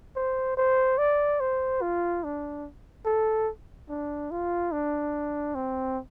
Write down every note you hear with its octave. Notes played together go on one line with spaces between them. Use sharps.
C5
C5
D5
C5
F4
D4
A4
D4
F4
D4
C4